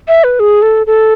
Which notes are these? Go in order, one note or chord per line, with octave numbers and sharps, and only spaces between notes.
E5
B4
G#4
A4
A4